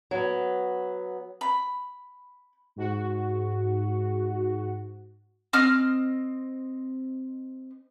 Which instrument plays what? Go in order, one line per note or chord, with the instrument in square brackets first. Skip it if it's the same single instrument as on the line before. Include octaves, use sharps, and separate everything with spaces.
[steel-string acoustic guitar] F#3 B3
[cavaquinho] B5
[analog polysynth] G#2 F#4
[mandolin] C4 D#5 F6